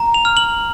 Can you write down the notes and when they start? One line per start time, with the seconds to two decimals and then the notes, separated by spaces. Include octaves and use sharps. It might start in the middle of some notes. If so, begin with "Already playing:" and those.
Already playing: A#5
0.14 F7
0.25 F6
0.37 F#7